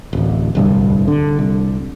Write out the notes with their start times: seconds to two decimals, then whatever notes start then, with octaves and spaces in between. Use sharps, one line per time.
0.13 D1 A1
0.55 D1 C2 G2
1.08 D3
1.39 C2